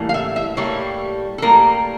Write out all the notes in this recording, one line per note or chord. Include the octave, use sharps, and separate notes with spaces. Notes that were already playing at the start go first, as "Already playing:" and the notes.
Already playing: A2 E3 G3 A#3
F5
E5
E5
A2 G3 A#3 C#5
A4
A2 G3 A#3 A#4